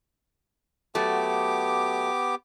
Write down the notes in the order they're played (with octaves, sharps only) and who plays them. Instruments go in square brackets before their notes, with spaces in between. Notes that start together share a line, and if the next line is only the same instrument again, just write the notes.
[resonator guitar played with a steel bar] F#3 A3 [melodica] B3 G4 D6